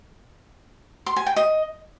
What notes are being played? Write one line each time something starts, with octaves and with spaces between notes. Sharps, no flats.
C6
G#5
G5
D#5